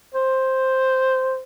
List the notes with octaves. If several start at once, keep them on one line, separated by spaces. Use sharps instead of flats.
C5